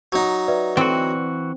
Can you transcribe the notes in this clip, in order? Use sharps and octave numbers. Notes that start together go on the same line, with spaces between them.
F#3 D#4
B4 D5 E5
E3 C4 F#4